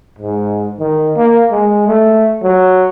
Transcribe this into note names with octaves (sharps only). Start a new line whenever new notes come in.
G#2
D#3
A#3
G#3
A3
F#3